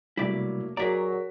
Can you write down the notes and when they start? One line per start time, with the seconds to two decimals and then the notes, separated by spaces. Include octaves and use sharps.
0.17 C3 F#3 G3 A3 A#3 E4 D5
0.77 F#3 F#4 G#4 A#4 D5 A#5 B6